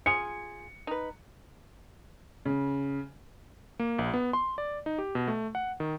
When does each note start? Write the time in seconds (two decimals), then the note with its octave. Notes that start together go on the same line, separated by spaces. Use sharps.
0.06 F4 G#4 C#7
0.87 D#4 B4
2.45 C#3
3.79 A#3
3.99 A#1
4.14 B3
4.33 C6
4.58 D5
4.86 D#4
4.98 G4
5.15 B2
5.28 A3
5.55 F#5
5.80 D#3